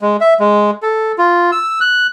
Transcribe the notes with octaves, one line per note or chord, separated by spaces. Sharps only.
G#3
E5
G#3
A4
F4
E6
F#6